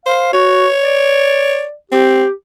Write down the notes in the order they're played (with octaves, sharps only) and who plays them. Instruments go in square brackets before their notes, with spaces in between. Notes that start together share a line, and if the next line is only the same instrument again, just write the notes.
[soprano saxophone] C5 [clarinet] F5
[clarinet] F#4 [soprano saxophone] C#5
[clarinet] D5
[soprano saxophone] C4 [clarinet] G4